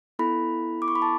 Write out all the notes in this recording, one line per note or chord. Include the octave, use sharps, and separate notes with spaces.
B3 E4 A4 B5
D6
C#6
B5
A5